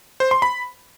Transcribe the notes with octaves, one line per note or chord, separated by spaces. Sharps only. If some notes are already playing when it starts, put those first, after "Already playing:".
C5
C6
B5